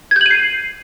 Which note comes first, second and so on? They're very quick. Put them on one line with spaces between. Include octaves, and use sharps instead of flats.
G#6 G6 F#7 D#7 C7